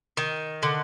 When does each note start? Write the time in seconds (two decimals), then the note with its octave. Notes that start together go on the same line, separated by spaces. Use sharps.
0.17 D#3
0.63 D3